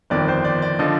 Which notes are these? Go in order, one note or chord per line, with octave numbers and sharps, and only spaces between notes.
G1 F2 D#3 D5
C5
D5
D5
D3 F3 D#5